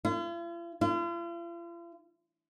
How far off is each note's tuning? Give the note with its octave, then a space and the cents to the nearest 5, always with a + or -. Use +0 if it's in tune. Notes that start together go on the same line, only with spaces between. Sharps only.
F4 -45
F4 -45